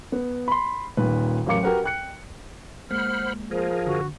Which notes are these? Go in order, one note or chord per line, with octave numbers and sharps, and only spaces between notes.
B3
B5 C6
D#1 A#2 D#3 B4
A1 F#3 A#4 F5 D6 C#7
F#4 G4 A#4 B4 F#5
G5 F#6 C#7
G#3 A#3 C5 F#5 B5 F6
F3 G#4 A#4 C5
F#2 D3 F#4